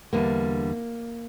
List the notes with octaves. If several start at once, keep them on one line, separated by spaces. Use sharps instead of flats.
E2 D3 G3 A#3